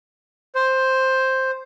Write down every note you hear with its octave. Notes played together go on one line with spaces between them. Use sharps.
C5